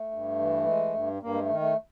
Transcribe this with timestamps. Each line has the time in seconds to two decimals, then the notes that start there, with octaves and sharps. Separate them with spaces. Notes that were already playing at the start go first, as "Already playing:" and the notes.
Already playing: A3
0.11 G2
0.39 E3
0.66 G#3
0.95 G2
1.22 G2 A#3
1.34 G#3
1.41 A3
1.50 D#3
1.60 A3